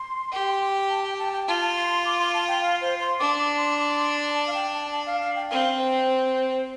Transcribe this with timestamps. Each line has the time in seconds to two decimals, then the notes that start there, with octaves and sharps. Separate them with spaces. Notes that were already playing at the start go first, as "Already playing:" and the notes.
Already playing: C6
0.32 G4
0.90 A5
1.04 G5
1.19 A5
1.33 G5
1.47 F4 A5
1.61 A5
1.76 C6
1.90 C6
2.05 D6
2.19 C6
2.34 A5
2.48 G5
2.62 F5
2.81 C5
3.01 C6
3.19 D4 D6
3.39 D6
3.58 C6
3.77 D6
3.96 C6
4.16 A5
4.35 A5
4.47 F5
4.54 G5
4.73 A5
4.92 A5
5.06 F5
5.22 F5
5.36 G5
5.49 C4 F5
5.78 C5